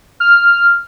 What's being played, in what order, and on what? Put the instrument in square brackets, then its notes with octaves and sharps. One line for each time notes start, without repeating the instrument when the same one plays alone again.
[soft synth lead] F6